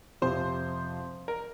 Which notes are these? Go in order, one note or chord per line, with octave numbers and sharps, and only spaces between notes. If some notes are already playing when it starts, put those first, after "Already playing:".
F2 C3 F3 C4 G4 C5
A#4